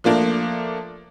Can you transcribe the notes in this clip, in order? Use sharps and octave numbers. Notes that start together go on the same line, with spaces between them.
F3 A3 A#3 D4